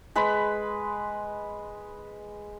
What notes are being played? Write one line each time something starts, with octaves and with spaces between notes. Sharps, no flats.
G#3 B4 B5